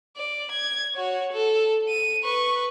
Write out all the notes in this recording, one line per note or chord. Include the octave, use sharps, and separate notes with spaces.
D5
G#6
F#4 C#5
A4
D#7
B4 C#6